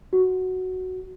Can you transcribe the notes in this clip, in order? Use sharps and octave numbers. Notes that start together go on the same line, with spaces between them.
F#4